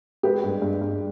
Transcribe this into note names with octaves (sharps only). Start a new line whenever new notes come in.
G#3 G4 B4
G2
G2
G2